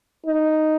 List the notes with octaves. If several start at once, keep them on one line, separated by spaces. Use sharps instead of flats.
D#4